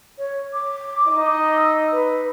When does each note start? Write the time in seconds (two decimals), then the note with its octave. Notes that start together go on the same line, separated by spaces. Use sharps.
0.18 C#5
0.53 D6
1.08 D#4 D#5
1.56 E6
1.92 B4